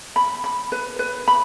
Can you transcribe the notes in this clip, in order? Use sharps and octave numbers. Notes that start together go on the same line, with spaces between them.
B5
B5
B4
B4
B5